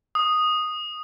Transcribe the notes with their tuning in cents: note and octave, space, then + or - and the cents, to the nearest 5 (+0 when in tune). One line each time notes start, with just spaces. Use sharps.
D#6 -5